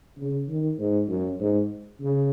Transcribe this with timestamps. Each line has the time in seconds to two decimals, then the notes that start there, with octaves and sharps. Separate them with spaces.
0.17 C#3
0.48 D#3
0.78 G#2
1.08 F#2
1.39 G#2
2.01 C#3